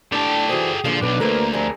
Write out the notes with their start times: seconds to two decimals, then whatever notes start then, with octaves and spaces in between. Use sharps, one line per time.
0.12 A2 D4 G4 A4 A5
0.49 E3 F#4 G#4 C5
0.85 A#2 D3 F3 G3
1.02 B1 D4 B4
1.20 D2 A#3 A4 B4 C5
1.53 F3 G3 C4 G#4 A#4